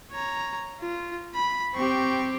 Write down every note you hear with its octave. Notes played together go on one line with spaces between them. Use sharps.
C#5 A#5
F4
B5
C4 G4 C#6